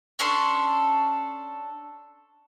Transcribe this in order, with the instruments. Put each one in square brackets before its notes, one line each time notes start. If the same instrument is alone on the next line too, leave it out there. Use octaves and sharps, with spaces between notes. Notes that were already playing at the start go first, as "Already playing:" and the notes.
[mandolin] C#4 D4 A4 C6